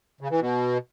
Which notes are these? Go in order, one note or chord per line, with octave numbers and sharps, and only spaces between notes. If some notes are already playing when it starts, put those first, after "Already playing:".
C#3
E3
B2